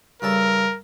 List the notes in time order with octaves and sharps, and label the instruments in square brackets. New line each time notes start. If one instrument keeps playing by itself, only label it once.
[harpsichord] G2 C#3 A4 [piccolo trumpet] A#4